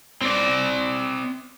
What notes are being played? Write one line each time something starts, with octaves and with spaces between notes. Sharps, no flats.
C4 D5